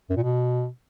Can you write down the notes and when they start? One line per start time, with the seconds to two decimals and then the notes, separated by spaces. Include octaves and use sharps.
0.10 F#2
0.16 A#2
0.23 B2